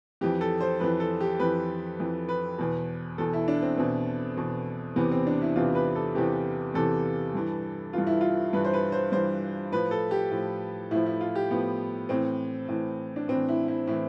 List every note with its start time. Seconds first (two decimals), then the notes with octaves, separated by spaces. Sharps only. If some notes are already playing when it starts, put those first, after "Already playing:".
0.21 F2 E3 G4
0.41 A4
0.61 C5
0.80 F2 E3 B4
1.00 A4
1.20 G4
1.40 F2 E3 B4
2.00 F2 E3
2.29 B4
2.58 E2 B2
3.18 E2 B2 A4
3.33 E4
3.48 D4
3.62 C4
3.77 E2 B2 C4
4.37 E2 B2
4.96 E2 C3 E3 B3
5.11 C4
5.27 D4
5.42 E4
5.56 E2 C3 E3 F4
5.75 B4
5.96 A4
6.15 E2 C3 E3 G4
6.74 E2 C3 E3 A4
7.34 G2 E3
7.93 G2 E3 F4
8.07 E4
8.21 F4
8.53 G2 E3 B4
8.64 C5
8.73 B4
8.92 C5
9.12 G2 E3 C5
9.72 A2 F3 B4
9.91 A4
10.11 G4
10.31 A2 F3
10.91 A2 F3 E4
11.06 E4
11.21 F4
11.35 G4
11.51 A2 F3 B3
12.09 A2 E3 C4
12.68 A2 E3
13.16 D4
13.28 A2 E3 C4
13.48 E4
13.68 E4
13.87 A2 E3 E4